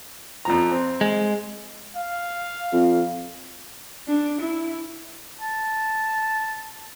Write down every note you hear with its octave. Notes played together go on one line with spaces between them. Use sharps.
F2 F3 A#5
C4
G#3
F5
F2
D4
E4
A5